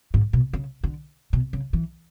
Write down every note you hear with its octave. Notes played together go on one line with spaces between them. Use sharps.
G#2
B2
C#3
D3
B2
C#3
E3